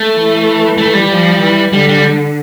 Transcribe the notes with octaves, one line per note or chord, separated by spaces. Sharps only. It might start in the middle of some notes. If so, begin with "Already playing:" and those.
Already playing: A3
E3
A3
G3
F3
E3
D3 G3
G3